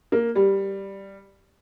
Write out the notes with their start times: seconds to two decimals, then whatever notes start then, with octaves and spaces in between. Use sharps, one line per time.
0.12 A#3
0.35 G3